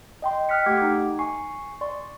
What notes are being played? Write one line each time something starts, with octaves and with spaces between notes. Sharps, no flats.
D#5 G5 C6
G5 D#6 F6 F#6 B6 C#7
A3 G4 F#5 D6 G#6
D#4
G#5 C#6 C7
D5 C6 C#6